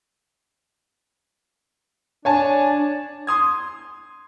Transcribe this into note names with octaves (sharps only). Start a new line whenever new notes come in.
D4 C#5 G#5 A5
C6 D#6 G#6